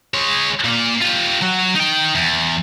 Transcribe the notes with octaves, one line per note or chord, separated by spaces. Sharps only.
G#3 C#5
A#2 A#3
F4 G4
F#3 F#4
D#4 G5
E2